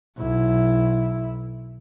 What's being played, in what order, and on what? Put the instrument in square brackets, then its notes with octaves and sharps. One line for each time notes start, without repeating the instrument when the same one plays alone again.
[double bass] B1 E4